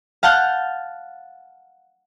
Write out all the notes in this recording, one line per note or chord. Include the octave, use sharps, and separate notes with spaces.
F5 F#5 A5 F6 G6